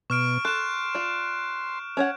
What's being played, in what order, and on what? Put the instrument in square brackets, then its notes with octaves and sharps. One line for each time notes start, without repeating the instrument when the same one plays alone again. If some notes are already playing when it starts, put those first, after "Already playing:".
[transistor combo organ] B2 [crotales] C#6 F6 D7
[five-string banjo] A4 [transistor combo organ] C6 [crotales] F#6 E7
[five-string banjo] F4 D5
C#4 C#5 F#5